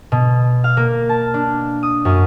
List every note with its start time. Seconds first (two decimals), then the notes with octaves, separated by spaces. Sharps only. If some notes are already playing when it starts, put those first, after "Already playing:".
0.12 B2
0.64 F5
0.77 A#3
1.09 A5
1.34 D4
1.83 D#6
2.05 F#2